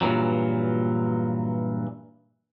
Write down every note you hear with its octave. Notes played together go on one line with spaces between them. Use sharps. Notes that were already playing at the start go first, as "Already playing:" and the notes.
G2 A#2 D#3 E3 F#3